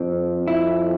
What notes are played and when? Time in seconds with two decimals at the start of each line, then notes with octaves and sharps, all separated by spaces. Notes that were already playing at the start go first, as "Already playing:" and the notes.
Already playing: F2 C4
0.48 E4